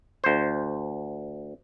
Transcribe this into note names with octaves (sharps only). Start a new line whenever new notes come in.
D2 C5